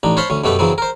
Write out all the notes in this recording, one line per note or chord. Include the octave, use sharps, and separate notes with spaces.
A1 D4 D#4
C5 C#5 F5 A5 B5 C6
D2 C#4
F#2 B2 A3 G4 B4
C#3 E3 F#3 B3 C4
A#4 C5